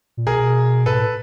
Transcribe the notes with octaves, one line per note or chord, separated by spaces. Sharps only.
A#2
B2 G#4 A#4
G#2 A4 B4
A2